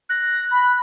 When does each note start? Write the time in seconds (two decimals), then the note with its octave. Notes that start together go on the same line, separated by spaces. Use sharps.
0.09 F#6 A#6
0.51 B5